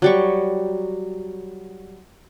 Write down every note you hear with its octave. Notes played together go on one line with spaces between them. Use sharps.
F#3 G3 C#6